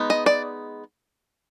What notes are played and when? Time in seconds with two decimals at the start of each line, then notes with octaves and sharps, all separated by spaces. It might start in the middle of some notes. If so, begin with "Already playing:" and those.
Already playing: G#3 B3 D#4
0.10 D#5
0.26 D5